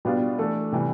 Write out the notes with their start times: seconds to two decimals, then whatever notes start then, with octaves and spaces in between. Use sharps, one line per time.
0.05 B2 G3 B3 D4 F4
0.38 E3 A3 D4 A4
0.72 C3 E3 G3